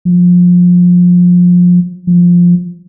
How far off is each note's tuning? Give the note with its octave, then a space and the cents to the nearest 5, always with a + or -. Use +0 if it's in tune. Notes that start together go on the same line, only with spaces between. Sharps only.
F3 +25
F3 +5